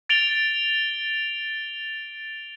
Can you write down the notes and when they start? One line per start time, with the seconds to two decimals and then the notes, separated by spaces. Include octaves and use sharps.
0.09 A6 D7 F7 G7